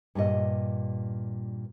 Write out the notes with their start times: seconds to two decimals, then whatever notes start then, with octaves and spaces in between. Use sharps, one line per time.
0.15 G2 A#2 D#5